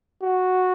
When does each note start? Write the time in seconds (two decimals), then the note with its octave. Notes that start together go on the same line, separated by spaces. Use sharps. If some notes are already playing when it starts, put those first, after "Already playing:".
0.23 F#4